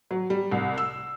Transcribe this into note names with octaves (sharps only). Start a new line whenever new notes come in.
F#3
G3
C2
E6